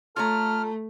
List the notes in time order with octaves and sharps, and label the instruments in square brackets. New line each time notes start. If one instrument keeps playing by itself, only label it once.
[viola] A3 [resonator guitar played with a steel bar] F4 C#5 A#5 [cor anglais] A4 [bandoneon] F6